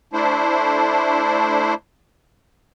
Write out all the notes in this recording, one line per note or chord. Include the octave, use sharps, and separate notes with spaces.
A3 D4 E4 C5